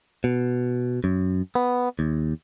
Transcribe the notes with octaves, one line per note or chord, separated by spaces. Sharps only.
B2
F#2
B3
D#2